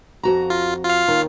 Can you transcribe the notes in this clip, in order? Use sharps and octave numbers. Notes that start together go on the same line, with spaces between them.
F2 F#4 A#5
F4
F4 F5
D#2 D#3